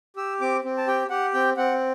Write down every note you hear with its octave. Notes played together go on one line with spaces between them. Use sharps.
G4 E6
C4 D6
C4
A5
G4 G5
G4 F#5
C4 G5
C4 F#5